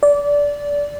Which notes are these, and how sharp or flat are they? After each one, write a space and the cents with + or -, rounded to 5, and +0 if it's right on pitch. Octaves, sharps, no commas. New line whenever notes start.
D5 -20